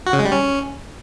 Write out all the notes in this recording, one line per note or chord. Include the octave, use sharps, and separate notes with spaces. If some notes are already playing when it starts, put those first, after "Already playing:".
F#4
C#3
G#3
G3
C#4